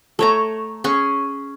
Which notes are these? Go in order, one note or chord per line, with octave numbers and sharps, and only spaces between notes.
A3 C#5 A#5
C#4 G#4 C#6